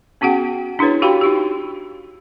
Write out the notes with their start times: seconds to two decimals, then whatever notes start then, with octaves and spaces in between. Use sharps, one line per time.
0.21 B3 C#4 F#4 G#4 F#5 G5
0.79 D4 E4 G#4 B4 C#5
1.02 F#4 G4 F5 G5 B5
1.21 D#4 F4 G4